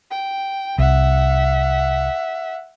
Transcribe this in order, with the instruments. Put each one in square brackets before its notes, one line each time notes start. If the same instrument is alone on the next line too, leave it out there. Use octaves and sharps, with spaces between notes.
[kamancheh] G5
[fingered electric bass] C2 [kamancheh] E5 F#5